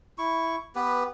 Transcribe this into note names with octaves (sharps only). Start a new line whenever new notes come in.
E4 C#6
B3 G4 B4